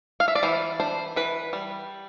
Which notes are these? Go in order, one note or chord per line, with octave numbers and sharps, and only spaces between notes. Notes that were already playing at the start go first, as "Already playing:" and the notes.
F5
E5
D5
E3 C5
D4 C5
E3 B4
G3